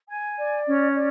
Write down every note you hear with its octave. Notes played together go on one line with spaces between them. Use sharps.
G#5
D5
C#4
D5